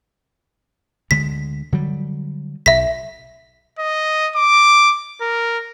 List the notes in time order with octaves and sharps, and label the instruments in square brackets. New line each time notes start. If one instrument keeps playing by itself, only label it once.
[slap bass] D2 D3 G#3 [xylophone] B6
[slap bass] D3 F#3 G3
[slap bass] B1 [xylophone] E5 B6
[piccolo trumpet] D#5
D6
A#4